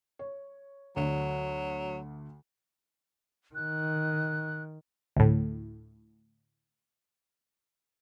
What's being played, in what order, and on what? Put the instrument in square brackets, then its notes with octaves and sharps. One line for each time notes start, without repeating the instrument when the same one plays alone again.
[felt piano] C#5
[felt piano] D2 D3 [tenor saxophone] F#3
[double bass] D#3 [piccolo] F#6
[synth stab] D2 A2